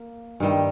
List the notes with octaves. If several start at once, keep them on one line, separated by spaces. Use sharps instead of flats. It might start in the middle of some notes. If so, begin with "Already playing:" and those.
Already playing: A#3
G2 D#3 G3